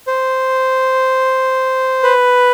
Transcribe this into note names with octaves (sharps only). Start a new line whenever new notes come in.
C5
B4